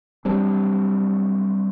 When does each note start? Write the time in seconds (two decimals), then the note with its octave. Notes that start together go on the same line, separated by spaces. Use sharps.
0.25 F#3 G3 C4 D4